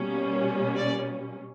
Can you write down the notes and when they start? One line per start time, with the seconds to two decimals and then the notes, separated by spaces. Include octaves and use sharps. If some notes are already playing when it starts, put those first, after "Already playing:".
Already playing: B2 G3 A#3 C#4
0.75 D5